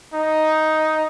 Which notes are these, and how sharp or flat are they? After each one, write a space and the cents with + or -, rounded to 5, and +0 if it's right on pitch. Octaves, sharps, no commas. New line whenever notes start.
D#4 +5